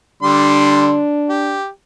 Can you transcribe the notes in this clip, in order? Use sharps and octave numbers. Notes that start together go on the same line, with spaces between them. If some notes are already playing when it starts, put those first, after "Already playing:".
D3 G3 D4 C6
G4